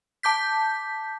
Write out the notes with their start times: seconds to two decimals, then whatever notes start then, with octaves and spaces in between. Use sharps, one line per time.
0.23 A5 D6 G6 B6